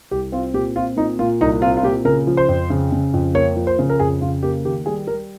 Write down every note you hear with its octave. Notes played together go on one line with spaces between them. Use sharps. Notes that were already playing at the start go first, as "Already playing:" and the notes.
C2 G4
C4 F4
A#2 G4
C4 F4
A#2 D#4
A#2 F4
C2 D#4
C4 F4
F4
A#2 G4
C#3 A#4
F3
C5
F2
C#3
C#3
F2
A#3 C#5
F3
C5
C#3
A#4
F2 G#4
C#3 F4
A#3 G4
D#3 G4
G3 G#4
G3 A#4